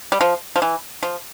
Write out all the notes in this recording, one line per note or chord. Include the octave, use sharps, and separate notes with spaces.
G3
F3
F3
E3
F3